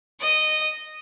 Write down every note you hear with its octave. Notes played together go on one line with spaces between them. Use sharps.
D#5